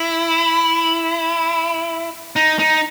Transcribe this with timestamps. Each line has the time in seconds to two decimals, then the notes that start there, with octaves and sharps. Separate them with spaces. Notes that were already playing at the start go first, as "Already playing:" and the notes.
Already playing: E4
2.36 D#4
2.59 D#4